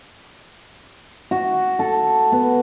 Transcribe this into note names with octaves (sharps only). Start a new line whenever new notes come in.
F#4
A4
B3